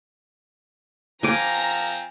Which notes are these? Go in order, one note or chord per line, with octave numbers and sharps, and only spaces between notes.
F3 C4 G#5 A#5 D6